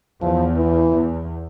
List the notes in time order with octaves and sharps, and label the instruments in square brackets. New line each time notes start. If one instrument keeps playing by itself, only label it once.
[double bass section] E2 [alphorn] F3
[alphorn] E3
[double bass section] E2